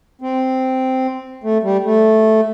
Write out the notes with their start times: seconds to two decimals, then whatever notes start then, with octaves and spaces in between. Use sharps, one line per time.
0.21 C4
1.44 A3
1.63 G3
1.84 A3